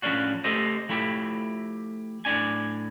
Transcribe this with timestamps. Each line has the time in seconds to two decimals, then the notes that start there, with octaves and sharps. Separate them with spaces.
0.02 A2 F3 A3 C#4 D4 F#4
0.44 A3 G4 A4 C5 D#5
0.89 F3 A3 E4 G4
2.25 A2 C#4 D4 G#5